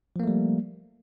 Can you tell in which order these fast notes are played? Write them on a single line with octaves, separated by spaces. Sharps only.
F3 A#3 A3 G3